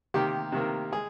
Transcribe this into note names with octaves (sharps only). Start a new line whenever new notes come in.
C3 D#3 A#3 G4
C3 D#3 A#3
G#3 G#4